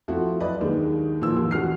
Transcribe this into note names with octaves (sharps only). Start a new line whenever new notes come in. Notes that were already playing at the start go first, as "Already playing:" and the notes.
F3 A3 C4 E4 F#4
F#3 E4 B4 D5 D#5
D#2 D#3 G#3 D4
A#2 E3 F3 A#3 E6
D#2
A1 F#4 F6 C7